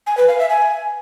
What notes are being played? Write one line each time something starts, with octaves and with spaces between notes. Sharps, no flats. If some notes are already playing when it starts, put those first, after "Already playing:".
G#5
B4
F5
E5
G#5